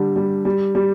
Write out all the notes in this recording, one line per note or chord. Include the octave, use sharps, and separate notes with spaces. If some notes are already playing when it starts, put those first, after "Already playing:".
Already playing: D3 G3
G3
G3
G3